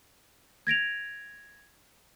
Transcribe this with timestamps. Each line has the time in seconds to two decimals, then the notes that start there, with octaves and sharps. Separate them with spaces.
0.67 G#6 A#6 D7 F7